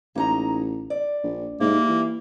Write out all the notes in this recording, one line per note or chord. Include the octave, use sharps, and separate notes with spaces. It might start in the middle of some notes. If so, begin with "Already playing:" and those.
A1 A#3 D#4 A#5
D5
A#1
G#2 G3 A#3 E4
E3